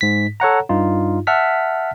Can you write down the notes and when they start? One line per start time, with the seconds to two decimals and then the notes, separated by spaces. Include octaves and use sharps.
0.01 G#2 B6
0.40 A4 C#5 F#5 A#5
0.69 G2 D#4 F4
1.27 E5 F#5 A5 F6 B6